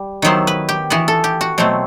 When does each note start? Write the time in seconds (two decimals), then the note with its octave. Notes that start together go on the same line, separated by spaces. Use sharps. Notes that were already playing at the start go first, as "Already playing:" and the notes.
Already playing: G3
0.22 D#3 F#3 B3 E4 C5
0.47 B4
0.69 G4
0.90 E3 B3 E4 F#4
1.08 A4
1.24 G4
1.41 F#4
1.58 B2 F#3 A3 C4